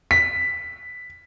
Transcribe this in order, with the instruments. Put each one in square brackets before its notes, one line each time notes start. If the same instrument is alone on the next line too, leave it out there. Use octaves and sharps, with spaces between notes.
[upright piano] B6